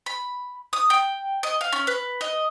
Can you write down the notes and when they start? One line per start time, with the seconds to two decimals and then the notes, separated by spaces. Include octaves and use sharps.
0.06 B5
0.73 D#6
0.90 G5
1.43 D#5
1.61 F5
1.72 C#4
1.87 B4
2.21 D#5